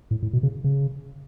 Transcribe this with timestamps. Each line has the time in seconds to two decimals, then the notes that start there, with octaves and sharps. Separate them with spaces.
0.11 A2
0.22 A2
0.33 B2
0.43 C#3
0.64 C#3